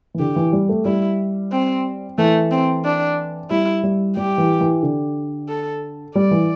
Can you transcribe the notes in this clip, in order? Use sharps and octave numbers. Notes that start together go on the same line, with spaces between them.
E3
D3 G4
E3
G3
A3
G3 E4
C4
E3 A3
C4
D4
G3 E4
G3
G3 G4
E3
E3
D3
A4
G3 D5
E3